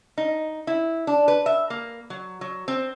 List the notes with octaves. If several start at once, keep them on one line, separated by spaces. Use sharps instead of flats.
D#4
E4
D4
B4
E5
A#3
F#3
F#3
C4